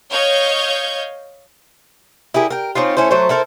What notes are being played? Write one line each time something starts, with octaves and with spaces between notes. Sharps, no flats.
C#5 D#5 F5 G6 G#6
E4 G4 G#4 A#4
A#4 G5
C4 C#4 D#4 F4
A3 C#4 E4 C5
F#3 A3 C5
E4 A4 A#4 C5